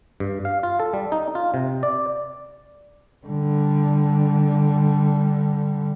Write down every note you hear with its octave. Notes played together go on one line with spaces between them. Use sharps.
G2
F5
F4
A4
G3
D#4
F4
C3
D5
D3 G3